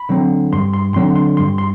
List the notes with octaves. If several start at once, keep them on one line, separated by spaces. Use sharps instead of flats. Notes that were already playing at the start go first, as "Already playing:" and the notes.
Already playing: B5
D3 F#3 C4
G2 C6
C6
D3 F#3 C4 C6
C6
G2 C6
C6